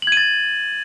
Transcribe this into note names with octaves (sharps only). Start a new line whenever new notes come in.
G#6 A6 D#7 F#7